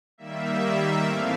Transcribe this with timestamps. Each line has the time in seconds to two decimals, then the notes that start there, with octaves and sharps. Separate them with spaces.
0.18 D#3 G3 A#3 E5
0.61 E5
1.03 A2 E3 A3 C4 F5